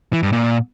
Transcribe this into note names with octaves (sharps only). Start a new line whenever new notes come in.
E3
G2
A#2